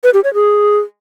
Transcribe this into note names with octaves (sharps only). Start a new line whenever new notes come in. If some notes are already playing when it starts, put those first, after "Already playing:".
B4
G4
C#5
G#4